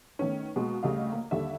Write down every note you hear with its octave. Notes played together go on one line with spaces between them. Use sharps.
D#3 A3 B3 C#4
B2 G#3 A#3
D2 C#3 G3 A3 D#5 F5
A#3
D#2 D3 G3 A4 E5